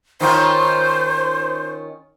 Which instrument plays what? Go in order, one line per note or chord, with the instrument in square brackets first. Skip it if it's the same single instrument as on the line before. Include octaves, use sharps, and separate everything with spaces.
[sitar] D#3 C#4 F4 [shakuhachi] C5